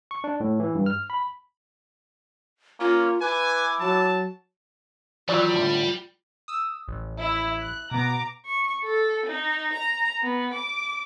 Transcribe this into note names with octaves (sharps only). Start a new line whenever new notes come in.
C#6
D4
A2
E3
G2
F6
B5
A#3 C#4 F4
E4 B4 G#5 D6
F#3 A5
D#3 E3 F#3 G3 F4 D5
A2 D3
D#6 E6
A1
E4
F#6
B2 B3 A#5 D6
C#6
A4
D#4
A#5
B3
D6